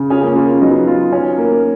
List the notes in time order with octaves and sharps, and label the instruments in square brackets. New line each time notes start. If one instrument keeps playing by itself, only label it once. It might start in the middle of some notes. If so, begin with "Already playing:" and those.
Already playing: [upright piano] C#3
[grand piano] C#4 F4 [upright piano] G#4
[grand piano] A#3 C#4
[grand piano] A#3 C#4 [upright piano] F4
[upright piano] F#3 [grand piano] B3 D#4
[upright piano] F4
C#4
A#3